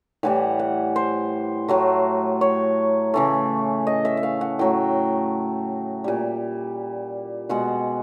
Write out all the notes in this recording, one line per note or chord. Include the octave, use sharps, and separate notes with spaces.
A2 E3 G3 F#5
F#5
C5
A2 F#3 A3
C#5
C#3 E3 A3
D#5
E5
E5
F5
F#5
A2 F#3 A3 G5
A#2 G3
B2 G#3 F#5